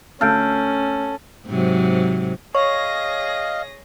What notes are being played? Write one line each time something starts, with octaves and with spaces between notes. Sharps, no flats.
D2 A3 C#4 A4 F5 F6 G6 D7
G#2 C3 F#3
G#4 C#5 D#5 F5 C#6 A#6